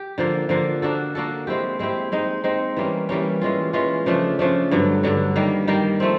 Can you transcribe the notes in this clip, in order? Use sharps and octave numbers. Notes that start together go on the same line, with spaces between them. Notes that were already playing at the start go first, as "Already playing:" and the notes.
Already playing: G4
D3 F3 A#3
D3 F3 A#3
A#3 D4 F#4 A4
A#3 D4 F#4 A4
G#3 C4 E4 G4
G#3 C4 E4 G4
G#3 C4 D#4
G#3 C4 D#4
E3 G3 A#3 C#4
E3 G3 A#3 C#4
E3 G#3 C#4 F4
E3 G#3 C#4 F4
C#3 F3 A3 D4
C#3 F3 A3 D4
G2 D3 F#3
G2 D3 F#3
D#3 G3 A#3
D#3 G3 A#3
F3 A3 C4